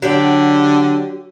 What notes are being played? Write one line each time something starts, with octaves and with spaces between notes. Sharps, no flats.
D3 F#3 G4 D5